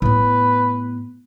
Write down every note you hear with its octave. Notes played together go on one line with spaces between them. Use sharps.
A2 B3 B4